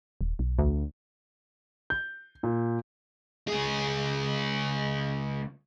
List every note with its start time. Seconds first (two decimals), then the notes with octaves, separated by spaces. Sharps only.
0.21 D#1
0.39 B1
0.58 D2
1.90 G6
2.43 A#2
3.48 C#2 G#4